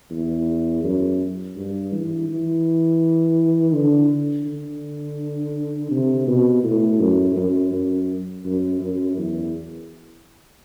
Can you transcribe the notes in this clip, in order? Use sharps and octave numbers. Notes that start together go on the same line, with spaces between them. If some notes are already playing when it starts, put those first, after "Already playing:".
E2
F#2
G2
E3
E3
D3
D3
C3
B2
A2
F#2
F#2
F#2
F#2
F#2
E2